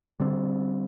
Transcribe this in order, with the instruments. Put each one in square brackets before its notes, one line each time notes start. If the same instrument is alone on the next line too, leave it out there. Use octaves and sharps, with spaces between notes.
[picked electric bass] D3 G3 C4